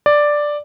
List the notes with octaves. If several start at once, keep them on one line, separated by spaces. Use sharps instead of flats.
D5